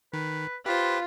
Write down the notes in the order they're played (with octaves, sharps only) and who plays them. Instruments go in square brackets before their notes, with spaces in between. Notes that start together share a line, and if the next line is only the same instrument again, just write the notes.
[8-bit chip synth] D#3 [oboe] B4
[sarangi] F4 [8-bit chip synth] G4 C5 [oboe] B4